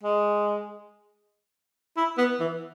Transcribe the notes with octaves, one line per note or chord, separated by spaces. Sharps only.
G#3
E4
B3
E3